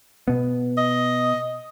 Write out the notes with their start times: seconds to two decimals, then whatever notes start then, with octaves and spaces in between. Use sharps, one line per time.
0.28 B2 B3
0.77 D#5